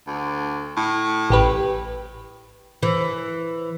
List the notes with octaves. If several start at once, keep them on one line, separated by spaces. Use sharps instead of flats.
D2
A2
A1 G4 B4
E3